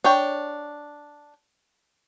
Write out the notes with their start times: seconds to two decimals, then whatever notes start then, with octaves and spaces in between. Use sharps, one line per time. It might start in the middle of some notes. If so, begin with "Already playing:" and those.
0.04 D4 C#5 G5